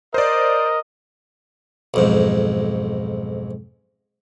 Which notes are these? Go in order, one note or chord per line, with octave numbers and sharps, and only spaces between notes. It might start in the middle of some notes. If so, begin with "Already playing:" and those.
A#4 C5 D5 D#5
B1 F2 G#2